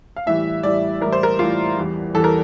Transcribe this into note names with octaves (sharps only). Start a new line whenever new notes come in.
F5
A2 E3 G3 E5
A2 E3 G3 D5
A2 E3 G3 A#4
C5
A#4
A2 E3 G3 F4
E2 E3 G3
E2 E3 G3 A4
A#4